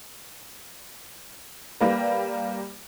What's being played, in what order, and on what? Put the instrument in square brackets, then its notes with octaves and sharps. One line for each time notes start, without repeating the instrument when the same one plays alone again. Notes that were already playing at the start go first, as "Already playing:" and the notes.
[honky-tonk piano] G3 A#3 B4